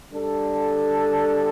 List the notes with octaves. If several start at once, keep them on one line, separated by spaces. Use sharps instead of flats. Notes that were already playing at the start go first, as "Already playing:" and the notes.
G3 D4 A4